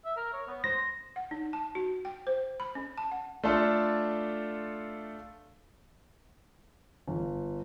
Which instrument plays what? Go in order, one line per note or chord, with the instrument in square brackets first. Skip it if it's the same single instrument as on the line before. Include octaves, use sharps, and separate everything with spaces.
[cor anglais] E5
A#4
C#5
B3
[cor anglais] C5 [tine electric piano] A#6
[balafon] F#5
D#4
A5
F#4
G5
C5
B5
C#4
A5
F#5
[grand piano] A3 D4 F4 A4
[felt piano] G1